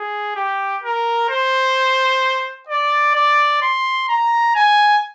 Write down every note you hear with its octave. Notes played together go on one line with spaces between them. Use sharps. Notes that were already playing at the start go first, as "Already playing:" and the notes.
Already playing: G#4
G4
A#4
C5
D5
D5
C6
A#5
G#5